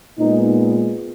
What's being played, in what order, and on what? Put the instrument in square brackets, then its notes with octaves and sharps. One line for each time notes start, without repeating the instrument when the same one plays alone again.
[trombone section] A#2 G#3 B3 D#4